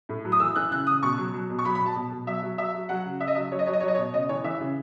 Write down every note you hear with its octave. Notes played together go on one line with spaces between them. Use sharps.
A2
F#3
D#6
E3 E6
E3 F#6
C#3 F#6
C#3 D#6
B2 C#6
F#3
F#3
B2
C#6
F#3 B5
B5
B2
A5
B2
B2
F#3 E5
F#3
F#3 E5
F#3
F#3 F#5
C#3
C#3 E5
D#5
F#3 E5
F#3 C#5
D#5
F#3 C#5
D#5
F#3 C#5
D#5
C#5
B2
C#3 D#5
E3 C#5
E3 E5
C#3